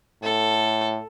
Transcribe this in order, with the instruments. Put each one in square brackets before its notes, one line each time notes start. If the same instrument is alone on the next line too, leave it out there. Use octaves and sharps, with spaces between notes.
[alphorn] A2 [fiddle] A4